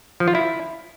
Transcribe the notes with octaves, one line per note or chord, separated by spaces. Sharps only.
F3
F4
E4